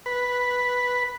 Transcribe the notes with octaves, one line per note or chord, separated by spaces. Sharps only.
B4